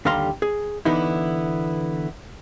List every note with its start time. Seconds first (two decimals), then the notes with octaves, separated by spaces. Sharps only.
0.05 D#2 D3 G3 F5 A#5 C6
0.42 G#4
0.85 D3 E3 B3 D#4 E4